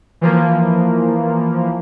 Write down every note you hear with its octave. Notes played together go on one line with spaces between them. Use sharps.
E3 F3 A#3